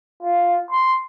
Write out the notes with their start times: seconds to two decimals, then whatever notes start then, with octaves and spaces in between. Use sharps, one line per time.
0.23 F4
0.70 C6